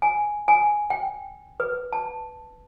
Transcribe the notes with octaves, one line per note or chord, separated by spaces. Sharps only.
G#5
G#5
G5
B4
A5